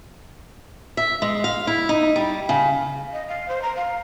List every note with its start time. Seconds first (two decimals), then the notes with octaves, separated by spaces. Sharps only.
0.97 E5
1.22 G#3
1.44 F5
1.67 E4
1.89 D#4
2.16 G3
2.49 C#3
3.13 D#5
3.28 F5
3.49 C5
3.62 A#5
3.75 F5